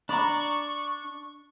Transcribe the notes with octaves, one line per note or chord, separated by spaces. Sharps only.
D4 D5 A#5 B5 C#6